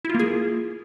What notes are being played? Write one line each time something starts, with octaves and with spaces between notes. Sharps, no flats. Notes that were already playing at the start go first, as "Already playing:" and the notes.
A#3 E4 F4 G#4